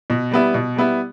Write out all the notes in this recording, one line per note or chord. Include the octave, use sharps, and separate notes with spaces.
B2
G3 B3 E4
B2
G3 B3 E4